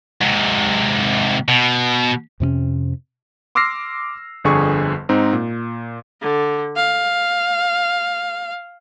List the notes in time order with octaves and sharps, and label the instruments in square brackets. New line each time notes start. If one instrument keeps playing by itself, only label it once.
[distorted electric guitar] G#2 C3
B2
[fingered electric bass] F2 C3 B3 C#4
[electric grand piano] C6 D6 E6 F6 A#6 C7
G1 F2 D3 G#4 C#6
G#2 C4 D#4
A#2
[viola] D3
F5